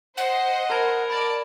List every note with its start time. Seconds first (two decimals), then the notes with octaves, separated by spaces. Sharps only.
0.17 C5 D#5 F#5
0.70 A#4 A5 B5 G#6
1.10 D5 A5 B5 A6